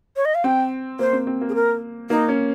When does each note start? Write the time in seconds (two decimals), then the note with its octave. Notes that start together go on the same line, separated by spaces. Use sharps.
0.16 C#5
0.25 D#5
0.35 F5
0.44 C4 G5
0.99 A#3 C5
1.13 C4
1.27 C4
1.41 A#3
1.49 G#4
1.55 A#4
2.10 A#3 D#4
2.28 C#4